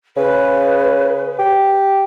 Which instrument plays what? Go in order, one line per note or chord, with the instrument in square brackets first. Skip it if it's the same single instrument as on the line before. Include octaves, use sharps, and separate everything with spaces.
[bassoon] C#3 [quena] B4
[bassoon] G4